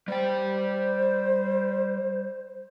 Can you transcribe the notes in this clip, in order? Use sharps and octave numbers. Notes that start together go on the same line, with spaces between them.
G3 C5 G5